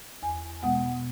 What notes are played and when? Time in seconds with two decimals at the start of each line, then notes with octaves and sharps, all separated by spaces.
0.22 E2 G#5
0.62 B2 G#3 B3 F#5